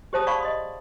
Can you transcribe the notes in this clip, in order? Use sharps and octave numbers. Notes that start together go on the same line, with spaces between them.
G4 G#4 C5 E5 A5 D#6
D5 F5 F#5 A5 B5 C#6
D#5 C6 D#6